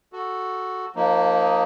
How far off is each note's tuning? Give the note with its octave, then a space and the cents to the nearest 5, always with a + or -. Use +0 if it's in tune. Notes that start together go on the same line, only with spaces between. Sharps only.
F#4 +0 A4 +0
F3 +30 A#3 +0 D#4 +0